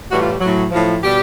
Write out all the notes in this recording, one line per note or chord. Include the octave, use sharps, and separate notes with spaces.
A2 E3 G3 F#4
F4
A2 F#3
A2 F3
B2 G3 G4